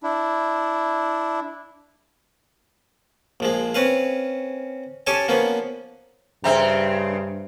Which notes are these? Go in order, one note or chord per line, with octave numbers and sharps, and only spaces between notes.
D4 E4
A#1 F3 G#3
C4 C#4 B4 F5
C#4 G4 A4 C#5 G#5 A5
F3 A#3 B3 C#4
G2 C#3 C4 C5 E5 A#5